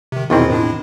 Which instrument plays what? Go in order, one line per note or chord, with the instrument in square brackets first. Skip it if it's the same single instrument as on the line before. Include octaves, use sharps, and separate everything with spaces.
[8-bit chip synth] C3 D#3
[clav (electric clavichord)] E2 D#3 C4 [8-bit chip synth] B2 E4 F4
[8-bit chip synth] A2 D4 E4